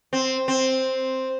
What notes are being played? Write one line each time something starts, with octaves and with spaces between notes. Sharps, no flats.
C4
C4